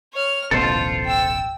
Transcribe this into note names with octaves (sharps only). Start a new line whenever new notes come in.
C#5 F6
D1 A1 B2 F4 A4 C5
G5 E6